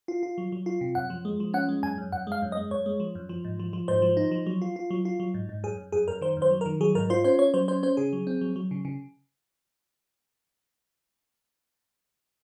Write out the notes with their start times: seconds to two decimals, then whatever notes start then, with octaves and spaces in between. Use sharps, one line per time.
0.08 F4
0.23 F4
0.38 F#3
0.52 F#3
0.66 F4
0.81 C3
0.95 F#2 F#5
1.10 F3
1.25 G#3
1.40 F3
1.54 C#4 F#5
1.69 G#3
1.83 F#2 G#5
1.98 F#2
2.12 F#2 F#5
2.27 G#3 F5
2.42 F#2
2.52 D#5
2.57 G#3
2.71 F#2 C#5
2.86 G#3
3.00 F3
3.15 F#2
3.29 F3
3.45 G#2
3.59 F3
3.73 F3
3.88 G#2 C5
4.02 F3
4.17 D#4
4.31 F3
4.46 F#3
4.62 F4
4.76 F4
4.90 F#3
5.05 F4
5.20 F#3
5.34 G#2
5.49 G#2
5.64 F#2 G#4
5.78 F#2
5.92 F#2 G#4
6.08 F#2 A#4
6.21 D#3 C5
6.37 F#2
6.42 C5
6.51 F#3
6.61 A#4
6.66 D#3
6.81 F#3 G#4
6.95 G#2 A#4
7.10 F4 C5
7.24 C#4 C5
7.39 C#4 C#5
7.54 F#3 C5
7.68 C#4 C5
7.83 C#4 C5
7.97 C#3 G#4
8.13 F#3
8.27 C4
8.41 F#3
8.56 F#3
8.71 C#3
8.85 C#3